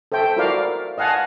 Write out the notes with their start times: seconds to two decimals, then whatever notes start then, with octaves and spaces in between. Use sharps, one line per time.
0.12 A4 C5 E5 G5
0.37 E4 F#4 A#4 C5 D5 F5
0.98 D#5 F5 F#5 G#5 A5